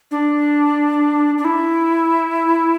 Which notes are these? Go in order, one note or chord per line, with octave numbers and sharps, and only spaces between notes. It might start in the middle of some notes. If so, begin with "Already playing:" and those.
D4
D4
E4